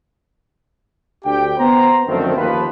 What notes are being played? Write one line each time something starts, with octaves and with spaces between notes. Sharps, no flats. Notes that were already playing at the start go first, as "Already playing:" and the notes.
D2 D4 G4 G5
B3 C5 A#5
F#2 D3 D#3 F3 A3 C4
D#2 F3 B4